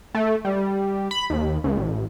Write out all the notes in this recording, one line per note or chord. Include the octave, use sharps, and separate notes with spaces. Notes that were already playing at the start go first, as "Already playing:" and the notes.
A3
G3
B5
D#2
C#2
A1